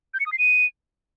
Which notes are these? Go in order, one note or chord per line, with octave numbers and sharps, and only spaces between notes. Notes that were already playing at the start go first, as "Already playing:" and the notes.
G6
C#7
D#6
C7
D#7